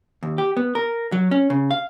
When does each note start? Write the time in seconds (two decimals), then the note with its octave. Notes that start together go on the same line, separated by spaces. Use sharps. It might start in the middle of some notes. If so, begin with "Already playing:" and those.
0.23 D#2
0.38 G4
0.57 B3
0.75 A#4
1.12 F#3
1.31 C#4
1.50 C#3
1.71 F5